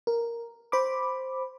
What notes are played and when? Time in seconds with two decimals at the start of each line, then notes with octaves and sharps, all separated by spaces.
0.07 A#4
0.72 C5 B5 D6